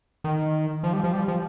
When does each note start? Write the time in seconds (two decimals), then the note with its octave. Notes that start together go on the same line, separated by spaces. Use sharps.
0.24 D#3
0.83 F3
0.93 G3
1.04 F3
1.13 G3
1.28 F3